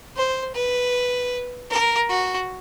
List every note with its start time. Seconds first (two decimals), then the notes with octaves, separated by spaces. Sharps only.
0.16 C5
0.54 B4
1.71 A#4
2.09 F#4